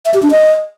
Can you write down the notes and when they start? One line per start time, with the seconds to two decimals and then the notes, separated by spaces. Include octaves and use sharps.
0.05 E5
0.14 G4
0.22 D4
0.31 D#5